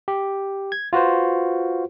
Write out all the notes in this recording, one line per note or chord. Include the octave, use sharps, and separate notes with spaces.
G4
G#6
F4 F#4 B4 C5